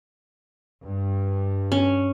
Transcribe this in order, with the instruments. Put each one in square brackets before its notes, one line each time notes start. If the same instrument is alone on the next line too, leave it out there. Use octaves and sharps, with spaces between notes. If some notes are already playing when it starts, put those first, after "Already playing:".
[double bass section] G2
[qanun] C#4